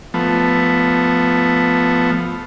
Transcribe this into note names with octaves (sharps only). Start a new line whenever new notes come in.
F3 A3 B3